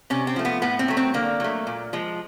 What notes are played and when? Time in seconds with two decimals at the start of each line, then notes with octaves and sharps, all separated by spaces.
0.10 C3 C#4
0.27 C4
0.36 F3 A3
0.45 B3
0.62 A2 B3
0.79 C4
0.88 F#3 A3
0.97 C4
1.14 D3 A#3
1.40 F#3 A3
1.67 A#2
1.93 F3 G#3